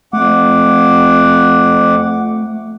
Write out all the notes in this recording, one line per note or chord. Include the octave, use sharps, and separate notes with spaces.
F2 A3 F#5 D6